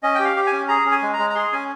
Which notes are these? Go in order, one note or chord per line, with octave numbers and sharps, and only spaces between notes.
C#4 D#5
G4 G5
F5
G4
G#5
C#4
G#4 A#5
C#4
G#5
G#3
A#5
G#3
A#5
G#4 C6
C#4 G#5